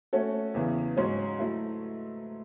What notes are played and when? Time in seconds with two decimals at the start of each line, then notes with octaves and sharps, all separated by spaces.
0.13 A3 C#4 F#4 A4
0.54 E2 C#3 E3
0.97 G#2 F#3 C#4
1.39 F#3 A3 E4